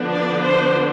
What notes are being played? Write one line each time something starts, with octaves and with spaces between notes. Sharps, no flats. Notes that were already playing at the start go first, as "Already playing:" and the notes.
Already playing: D3 F3 B3 D4
D5
C5